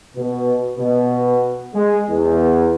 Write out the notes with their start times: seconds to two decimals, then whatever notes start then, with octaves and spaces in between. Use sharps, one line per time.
0.16 B2
0.78 B2
1.74 G#3
2.09 E2